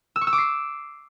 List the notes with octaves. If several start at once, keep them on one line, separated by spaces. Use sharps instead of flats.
E6
C#6
E6
D6
C7